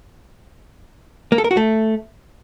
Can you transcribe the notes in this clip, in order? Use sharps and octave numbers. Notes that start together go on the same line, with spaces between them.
A#3
A4
A#4
F#4
A3